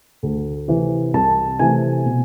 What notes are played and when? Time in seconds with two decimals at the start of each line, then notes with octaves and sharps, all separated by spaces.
0.23 D2
0.68 C3 E3
1.14 C2 A5
1.59 C3 E3 A3 G#5
2.06 B2